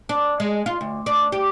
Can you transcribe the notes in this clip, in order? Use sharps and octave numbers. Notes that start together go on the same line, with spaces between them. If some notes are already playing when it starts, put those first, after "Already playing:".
D4
G#3
F4
D2
D4
G4